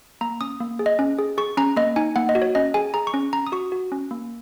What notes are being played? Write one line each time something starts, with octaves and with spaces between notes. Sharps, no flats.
A#3 A#5
C#4 D#6
A#3
G#4
D#5
C#4
G#4
G#4 C#6
C#4 A#5
A#3 D#5
D#4 G#5
A#3 F#5
D#5
F#4
C#5
C#4 D#5
G#4 G#5
G#4 A#5
C#6
C#4
C#4 A#5
D#6
F#4 C#6
F#4
C#4
A#3